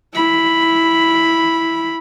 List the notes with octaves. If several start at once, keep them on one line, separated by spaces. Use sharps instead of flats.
E4 B5